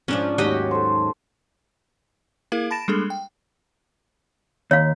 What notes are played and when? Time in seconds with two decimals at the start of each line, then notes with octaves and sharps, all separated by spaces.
0.08 G#2 F3 C#4 D4
0.38 D#2 G#2 F#3 F#4 G4 D#5
0.71 A4 C5
2.52 A#3 E4 G#4 A#4 F5
2.71 A5 B5 A6 A#6 D7 E7
2.88 G3 G#3 A#3 D4 G#4 A4
3.10 G5
4.71 D#2 C#5 F5